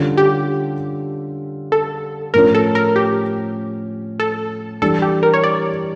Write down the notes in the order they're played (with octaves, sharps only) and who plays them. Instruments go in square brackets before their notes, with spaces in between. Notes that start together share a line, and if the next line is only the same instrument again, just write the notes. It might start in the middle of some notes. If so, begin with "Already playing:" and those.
Already playing: [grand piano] D3 G3 C#4 F4 A4
[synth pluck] G4
A4
[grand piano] A2 F3 C#4 [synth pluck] A#4
[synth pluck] A4
A#4
G4
A4
[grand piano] E3 G3 D4 [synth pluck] A4
[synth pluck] G4
A#4
C#5
D5